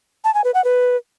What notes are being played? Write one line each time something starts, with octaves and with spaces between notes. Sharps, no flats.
A5
G#5
B4
F#5
B4